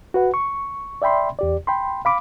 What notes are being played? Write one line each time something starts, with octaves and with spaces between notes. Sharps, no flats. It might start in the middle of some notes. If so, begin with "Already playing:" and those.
F#4 B4 F#5
C#6
D5 E5 G5 B5 C6
E2 G4 D5
G5 B5 C6
F5 B5 D6